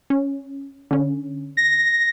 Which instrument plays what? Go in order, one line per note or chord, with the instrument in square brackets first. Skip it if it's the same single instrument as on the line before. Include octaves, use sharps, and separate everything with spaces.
[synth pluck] C#4
D3 C#4
[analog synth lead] A#6